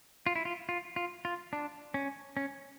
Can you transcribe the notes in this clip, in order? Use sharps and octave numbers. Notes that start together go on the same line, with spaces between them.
F4
E4
F4
F4
F4
F4
D4
C#4
C#4